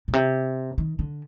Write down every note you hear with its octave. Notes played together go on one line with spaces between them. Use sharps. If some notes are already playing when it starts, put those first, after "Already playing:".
A#2
C3
D#3
D3